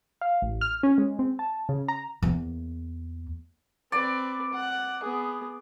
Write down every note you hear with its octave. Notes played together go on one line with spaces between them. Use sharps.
F5
A1
F6
C#4
G#3
C4
A5
C#3
A#5
E2 A#3
C4 B4 D5 D6
F#5
B3 G#4